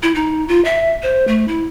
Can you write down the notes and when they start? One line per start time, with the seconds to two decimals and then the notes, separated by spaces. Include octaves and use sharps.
0.03 E4
0.15 D#4
0.48 F4
0.65 E5
1.03 C5
1.27 A3
1.48 E4